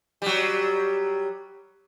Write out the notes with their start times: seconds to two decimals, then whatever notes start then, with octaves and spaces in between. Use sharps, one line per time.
0.22 F#3 G3